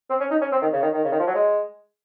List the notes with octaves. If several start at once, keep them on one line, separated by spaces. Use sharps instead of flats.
C4
C#4
D#4
C#4
C4
D#3
C#3
D#3
D#3
C#3
D#3
F3
F#3
G#3